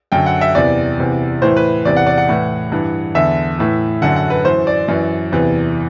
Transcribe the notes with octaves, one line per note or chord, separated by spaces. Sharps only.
F#2 D3 G5
F#5
E5
E2 C3 E3 D5
E2 C3 E3
A2 E3 C5
B4
E2 C3 E3 D5
F#5
D5
F#5
A2 E3
G2 E3
E2 D3 E5
A2 E3
F#2 D3 F#5
F#5
B4
F#2 E3 C5
D5
F#2 E3
E2 C3 E3